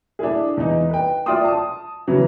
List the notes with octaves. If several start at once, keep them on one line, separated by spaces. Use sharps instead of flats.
D4 E4 G#4
E2 D#4
B4 G5
F4 D5 E5 G5 C6 D#6
A5 D#6
C#3 E3 F#3